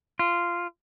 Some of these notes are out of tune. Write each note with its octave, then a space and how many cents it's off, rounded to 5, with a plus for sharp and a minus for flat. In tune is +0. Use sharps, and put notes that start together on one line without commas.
F4 -10